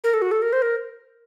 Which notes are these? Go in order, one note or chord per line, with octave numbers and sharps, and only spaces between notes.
A#4
A4
F#4
A4
A#4
C5
A#4